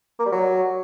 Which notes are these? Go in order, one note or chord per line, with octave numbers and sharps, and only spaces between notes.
A#3
G3
F#3